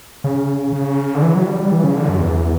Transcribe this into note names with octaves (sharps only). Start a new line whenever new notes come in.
C#3
C#3
D3
E3
F#3
G3
G3
E3
C#3
D3
F#2
E2